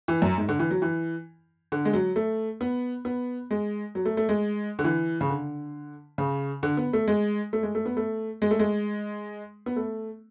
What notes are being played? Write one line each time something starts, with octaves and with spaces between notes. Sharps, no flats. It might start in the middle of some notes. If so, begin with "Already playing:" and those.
E3
F#2
G#2
D3
E3
F#3
E3
D3
G#3
F#3
A3
B3
B3
G#3
F#3
A3
A3
G#3
D3
E3
C#3
D3
C#3
D3
B3
A3
G#3
A3
G#3
A3
B3
A3
G#3
A3
G#3
B3
A3